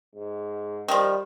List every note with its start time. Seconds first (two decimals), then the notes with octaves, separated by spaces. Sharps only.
0.15 G#2
0.88 D#3 F3 G3